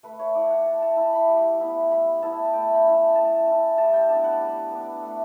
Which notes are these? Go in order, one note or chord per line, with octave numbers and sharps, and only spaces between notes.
A3 B4
C#5
E4 D5
F#5
A3 A5
A5
E4 B5
B5
G3
B3 E4
G3 B5
B3 E4 A5
A3 G5
B5
C#4 E4
A5
A3 A5
C#4 E4 A5
G3 A5
G5
B3 D4 A5
F#5
G3
B3 D4
A3